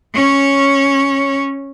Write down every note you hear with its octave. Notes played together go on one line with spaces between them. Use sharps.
C#4 C#5